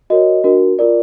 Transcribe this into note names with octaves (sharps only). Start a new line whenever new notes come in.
F#4 A#4 C#5 D#5
D4 F#4 A#4
F4 A#4 D5